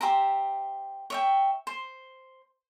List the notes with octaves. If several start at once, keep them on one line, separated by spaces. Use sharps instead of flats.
G4 C5 E5 A#5
C#5 E5 G5
C5